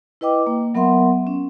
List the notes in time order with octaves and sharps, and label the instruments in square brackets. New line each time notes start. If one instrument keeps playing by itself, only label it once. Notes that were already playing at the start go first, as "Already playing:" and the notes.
[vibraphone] E4 B4 D#5 G5 D6
A#3
F#3 B3 A#4 E5 F#5 C6
C#4